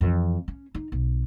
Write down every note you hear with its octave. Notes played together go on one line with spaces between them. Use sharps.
F2 E3
C#4
D#4
B1